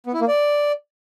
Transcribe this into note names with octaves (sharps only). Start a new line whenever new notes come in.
B3
E4
A#3
D5